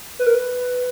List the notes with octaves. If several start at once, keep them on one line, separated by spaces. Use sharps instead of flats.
B4
A#4
B4